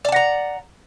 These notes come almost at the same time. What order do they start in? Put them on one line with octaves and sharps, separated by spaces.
D5 A5 F#5 A#5